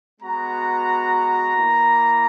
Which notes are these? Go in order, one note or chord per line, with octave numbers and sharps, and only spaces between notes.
G#3 B3 F#4 A#5
A#3 E4